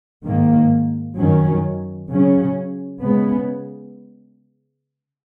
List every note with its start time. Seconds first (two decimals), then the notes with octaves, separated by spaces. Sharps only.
0.24 G#2 D#3 A#3
1.17 F#2 D#3 F#3 C#4
2.09 C#3 F#3 C#4
3.02 C#3 G#3 B3